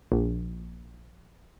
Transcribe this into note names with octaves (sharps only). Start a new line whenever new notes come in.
A#1